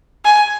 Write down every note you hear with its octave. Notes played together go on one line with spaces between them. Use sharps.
G#5